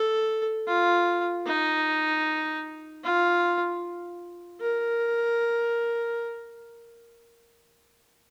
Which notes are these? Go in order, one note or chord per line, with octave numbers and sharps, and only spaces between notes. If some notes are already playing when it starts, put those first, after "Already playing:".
Already playing: A4
F4
D#4
F4
A#4